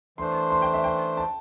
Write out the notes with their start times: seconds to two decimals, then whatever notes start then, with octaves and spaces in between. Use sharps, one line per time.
0.18 E3 A3 D4 C5 C6
0.50 C6
0.62 G5
0.73 E5
0.84 G5
1.17 A5